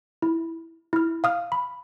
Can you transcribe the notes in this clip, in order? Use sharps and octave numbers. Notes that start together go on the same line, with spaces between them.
E4
E4 F6
F5 D#6 F6
B5